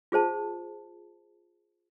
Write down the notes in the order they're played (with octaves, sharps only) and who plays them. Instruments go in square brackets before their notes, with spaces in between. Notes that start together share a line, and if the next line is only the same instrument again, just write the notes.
[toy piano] F4 G#4 C5 A5